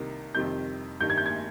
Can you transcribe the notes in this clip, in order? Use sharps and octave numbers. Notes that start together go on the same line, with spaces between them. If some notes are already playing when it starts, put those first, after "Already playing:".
Already playing: C2 C3 D#3 A#3
F2 C3 D#3 G3 C4 G6
G2 D#3 G3 G6
G#6
G6
G#6